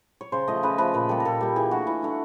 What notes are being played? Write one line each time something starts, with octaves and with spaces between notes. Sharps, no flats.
C#5
C#3 C5
F3 A3 D#5
C#3 B4
F3 A3 B4
A#2 B4
G3 A#3 A4
A#4
A#2 A4
G3 A#3 G4
E3 G#4
A3 D4 F#4
E3 E4
A3 D4